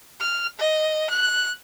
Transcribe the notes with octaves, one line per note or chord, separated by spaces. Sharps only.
F6
D#5
F#6